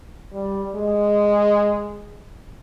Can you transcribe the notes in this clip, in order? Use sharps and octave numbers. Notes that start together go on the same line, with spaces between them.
G3
G#3